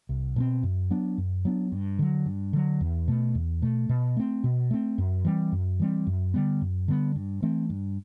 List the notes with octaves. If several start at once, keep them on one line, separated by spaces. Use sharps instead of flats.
C2
B2 A3 C4
F#2
F#3 B3 D4
F#2
F#3 B3 D4
G2
D3 F#3
G2
D3 F#3
E2
B2 A3
E2
B2 A3
B2
A3 C4
B2
A3 C4
F#2
E3 G3 C4
F#2
E3 G3 C4
F#2
D3 G3 B3
F#2
D3 G3 B3
G2
E3 A3 C4
G2